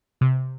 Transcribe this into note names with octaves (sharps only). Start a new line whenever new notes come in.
C3